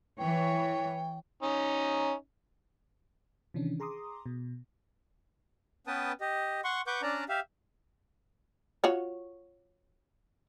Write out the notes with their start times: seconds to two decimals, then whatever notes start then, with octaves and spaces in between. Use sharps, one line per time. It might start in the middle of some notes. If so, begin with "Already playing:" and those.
0.19 E3 C#5 G5
1.43 C#4 D#4
3.54 C3 D#3 E3 C#4 D4
3.80 G#4 A#5 C6 D6 D#6
4.26 B2
5.87 B3 C#4 B4 G5 A5 D#6
6.21 G4 D#5
6.64 F#5 C6 C#6
6.87 B4 F#5 C#6 D6 G6
7.02 C#4 D4 D5 A5 A#5
7.29 G4 E5 F5
8.84 F4 F#4 C#5